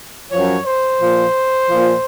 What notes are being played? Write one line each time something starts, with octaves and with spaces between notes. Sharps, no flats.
F#2 F3 C#5
C5
A#2 F3
A#2 F3